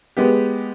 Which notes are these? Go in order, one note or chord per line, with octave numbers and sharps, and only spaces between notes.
G#3 B3 G4